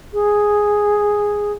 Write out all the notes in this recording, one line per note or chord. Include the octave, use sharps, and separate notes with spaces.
G#4